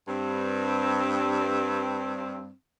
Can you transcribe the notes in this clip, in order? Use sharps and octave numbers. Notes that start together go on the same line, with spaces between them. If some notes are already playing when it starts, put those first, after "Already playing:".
G2 C4